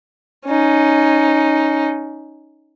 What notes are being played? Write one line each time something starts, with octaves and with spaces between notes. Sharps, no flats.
C#4 D#4